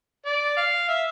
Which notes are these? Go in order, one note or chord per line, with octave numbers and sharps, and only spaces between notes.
D5
F5
E5